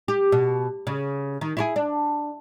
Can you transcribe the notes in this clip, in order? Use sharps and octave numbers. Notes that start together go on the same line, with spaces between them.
G4
B2
C#3
D#3
E4 F4 G#4
D4